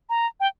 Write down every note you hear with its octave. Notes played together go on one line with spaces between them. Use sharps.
A#5
G5